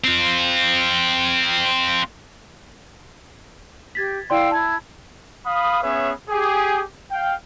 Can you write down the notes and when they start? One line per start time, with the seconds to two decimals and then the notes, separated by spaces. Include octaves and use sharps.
0.04 C4 F4
3.95 G4 G#6 A6 B6
4.30 E4 D5 F5 G5 C6 E6
4.51 E4 A5 G#6
5.46 F5 B5 D#6
5.82 B3 C#4 G#4 B4 C#5 E5
6.29 G4 G#4
7.11 F5 G5